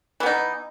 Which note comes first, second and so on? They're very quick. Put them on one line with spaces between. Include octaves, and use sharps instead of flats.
E3 B3 D#4